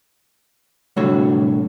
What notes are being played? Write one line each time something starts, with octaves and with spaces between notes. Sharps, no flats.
C2 A2 D3 F#3 F#4 C#5